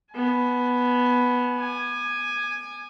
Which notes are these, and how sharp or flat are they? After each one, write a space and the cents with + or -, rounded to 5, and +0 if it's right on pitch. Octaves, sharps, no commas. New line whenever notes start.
B3 +0 G#5 +40
G#5 +0 D6 +45